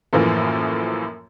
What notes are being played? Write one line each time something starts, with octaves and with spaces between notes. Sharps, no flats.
F#2 A2 E3 F3 A#3